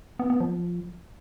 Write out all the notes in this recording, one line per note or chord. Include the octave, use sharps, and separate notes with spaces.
B3
B3
F3